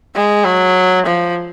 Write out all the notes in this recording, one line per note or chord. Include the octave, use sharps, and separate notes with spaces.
G#3
F#3
F3